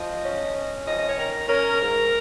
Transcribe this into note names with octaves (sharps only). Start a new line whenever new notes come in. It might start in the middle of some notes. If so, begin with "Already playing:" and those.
Already playing: F3 D#5
C#4
C#4
F2 D#5
D#5
C#5
D#3 A#4
C#4 A#4
G#2